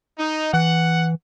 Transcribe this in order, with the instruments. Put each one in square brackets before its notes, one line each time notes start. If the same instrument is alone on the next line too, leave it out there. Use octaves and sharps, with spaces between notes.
[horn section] D#4
[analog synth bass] E3 [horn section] F#5